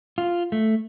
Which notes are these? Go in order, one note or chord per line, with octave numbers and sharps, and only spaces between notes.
F4
A3